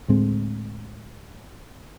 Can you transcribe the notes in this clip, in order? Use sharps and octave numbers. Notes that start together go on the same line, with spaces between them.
D2 A2 G#3 C4